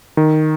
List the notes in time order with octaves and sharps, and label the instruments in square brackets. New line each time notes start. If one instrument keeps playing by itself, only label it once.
[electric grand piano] D#3